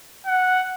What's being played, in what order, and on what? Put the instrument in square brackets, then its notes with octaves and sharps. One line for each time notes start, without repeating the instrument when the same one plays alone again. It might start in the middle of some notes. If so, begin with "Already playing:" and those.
[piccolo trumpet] F#5